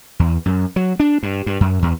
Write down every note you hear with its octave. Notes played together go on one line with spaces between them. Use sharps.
E2
F#2
F#3
D4
G2
G2
F#2
E2